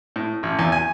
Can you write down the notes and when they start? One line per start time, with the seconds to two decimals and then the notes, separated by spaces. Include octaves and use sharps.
0.16 A2
0.43 A1
0.59 E2
0.72 G#5